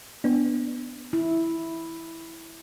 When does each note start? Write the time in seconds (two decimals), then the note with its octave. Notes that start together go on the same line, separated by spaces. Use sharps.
0.24 B3 D4
1.13 E4